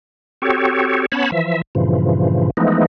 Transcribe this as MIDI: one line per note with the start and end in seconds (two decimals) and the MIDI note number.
0.42 1.06 60
0.42 1.06 66
0.42 1.06 67
0.42 1.06 69
0.42 1.06 73
1.12 1.31 59
1.12 1.31 61
1.12 1.31 73
1.12 1.31 81
1.12 1.31 83
1.32 1.62 52
1.32 1.62 53
1.32 1.62 76
1.75 2.50 43
1.75 2.50 46
1.75 2.50 49
1.75 2.50 52
1.75 2.50 53
2.57 2.86 52
2.57 2.86 53
2.57 2.86 56
2.57 2.86 57
2.57 2.86 59
2.57 2.86 63